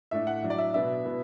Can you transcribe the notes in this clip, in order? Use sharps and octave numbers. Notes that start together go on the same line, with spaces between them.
A2 A3 D4 E5
F#5
A2 F#3 D4
D5
E5
B2 B3 D4 E5
B2 B3 E4